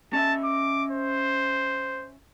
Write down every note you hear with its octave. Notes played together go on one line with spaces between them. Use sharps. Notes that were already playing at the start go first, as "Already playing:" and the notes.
C#4 D#5 E5 A5
D6
C5